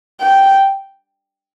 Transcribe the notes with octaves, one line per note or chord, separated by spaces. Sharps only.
G5